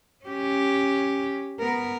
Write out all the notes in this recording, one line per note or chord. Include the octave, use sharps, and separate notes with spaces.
C#4 G4
B3 A#4